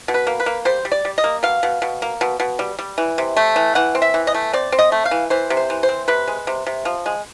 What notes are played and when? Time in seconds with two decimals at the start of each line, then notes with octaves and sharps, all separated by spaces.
0.08 B2
0.14 B4
0.27 A#3
0.40 B4
0.46 A#3
0.65 G3 C5
0.85 G3
0.92 D5
1.05 G3
1.18 D#5
1.24 A#3
1.43 B2 F5
1.63 B2
1.82 B2
2.02 A#3
2.21 B2
2.40 B2
2.59 G3
2.79 G3
2.98 E3
3.18 C3
3.37 A3
3.56 E3
3.75 E3 F#5
3.95 C4
4.02 E5
4.14 E3
4.27 D#5
4.34 A3
4.53 C4 D5
4.72 C4
4.79 D#5
4.92 A3
5.05 F5
5.11 E3
5.30 E3 C5
5.50 C3
5.57 C5
5.70 E3
5.83 C5
5.89 C4
6.08 C3 B4
6.28 G#3
6.47 C3
6.67 C3
6.85 F3
7.06 G#3